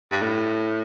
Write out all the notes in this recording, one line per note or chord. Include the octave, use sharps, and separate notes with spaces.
G2
A2